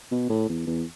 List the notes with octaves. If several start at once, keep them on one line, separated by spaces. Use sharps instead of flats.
B2
A2
E2
E2